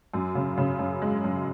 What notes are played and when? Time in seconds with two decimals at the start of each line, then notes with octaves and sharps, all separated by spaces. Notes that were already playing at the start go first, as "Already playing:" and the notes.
0.14 F#2
0.35 C#3
0.58 C#3
0.79 F#2
1.02 G#3
1.24 F#2